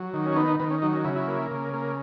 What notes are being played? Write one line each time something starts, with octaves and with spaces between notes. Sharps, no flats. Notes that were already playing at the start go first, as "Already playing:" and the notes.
Already playing: F#3
D#3
C#4
B3 D#4
D#4
D#3 B3
C#4
F#3 D#4
C#4
C#3 E4
E4
A#3
C#3
A#3